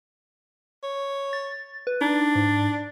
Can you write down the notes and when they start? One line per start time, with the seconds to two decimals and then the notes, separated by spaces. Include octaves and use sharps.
0.83 C#5
1.33 A6
1.87 B4
2.01 D4 D#4
2.35 G#2